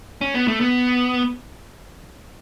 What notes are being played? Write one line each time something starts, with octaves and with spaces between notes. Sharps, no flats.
C#4
B3
A3
B3